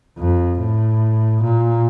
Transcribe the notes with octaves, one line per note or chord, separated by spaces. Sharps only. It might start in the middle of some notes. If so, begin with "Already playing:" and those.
F2
A2
A#2